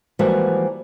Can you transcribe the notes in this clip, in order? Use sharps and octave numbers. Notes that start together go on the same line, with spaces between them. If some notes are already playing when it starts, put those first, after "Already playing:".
E3 F3 G3 G#3 A#3 F#4